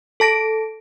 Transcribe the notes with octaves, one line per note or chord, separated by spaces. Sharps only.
A4 A5 A#6 D7